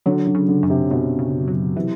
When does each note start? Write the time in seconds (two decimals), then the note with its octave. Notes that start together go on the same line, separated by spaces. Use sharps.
0.06 D3 F#3
0.27 D3
0.35 C#3
0.48 D3
0.63 F#2
0.70 C3
0.91 F#2 B2
1.19 C#3
1.48 F#3
1.76 C3 E3